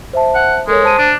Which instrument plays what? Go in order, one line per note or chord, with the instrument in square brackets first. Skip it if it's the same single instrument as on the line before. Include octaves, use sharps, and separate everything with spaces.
[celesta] C5 E5 A5
[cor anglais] F#5
[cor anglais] G#3 [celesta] A4 A#4 C#5
[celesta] C5 A5 D#7
[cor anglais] D4